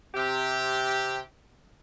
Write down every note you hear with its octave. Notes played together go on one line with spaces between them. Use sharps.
C3 G4